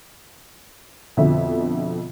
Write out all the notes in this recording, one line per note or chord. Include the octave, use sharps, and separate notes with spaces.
F2 B2 D3 E5